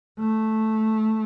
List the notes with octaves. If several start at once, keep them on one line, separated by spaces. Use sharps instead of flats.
A3